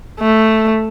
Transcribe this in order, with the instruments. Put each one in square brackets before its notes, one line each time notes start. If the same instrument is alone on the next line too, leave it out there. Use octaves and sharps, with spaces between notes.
[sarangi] A3